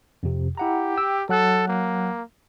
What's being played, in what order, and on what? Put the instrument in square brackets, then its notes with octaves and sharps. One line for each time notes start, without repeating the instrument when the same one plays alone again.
[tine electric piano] F2 C3
[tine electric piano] E4 F#5 A#5 [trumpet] G4
[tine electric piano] G5 E6
[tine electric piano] F#3 F#5 F#6 [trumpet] A4
[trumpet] A#3